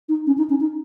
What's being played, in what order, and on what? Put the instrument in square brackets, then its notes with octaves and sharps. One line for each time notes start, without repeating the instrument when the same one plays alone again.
[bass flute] D#4
C#4
D#4
C#4
D#4